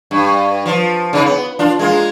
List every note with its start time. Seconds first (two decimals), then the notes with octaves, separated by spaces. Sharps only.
0.11 G2
0.66 F3
1.13 C#3 D#4
1.25 B3
1.59 D4 F4
1.79 G#3 A#3 F4